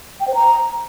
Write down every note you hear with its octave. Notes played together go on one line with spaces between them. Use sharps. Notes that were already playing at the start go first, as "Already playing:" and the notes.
G5
C5
A#5